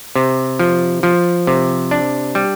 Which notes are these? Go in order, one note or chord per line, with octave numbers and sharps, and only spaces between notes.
C3
F3
F3
C3
D4
G3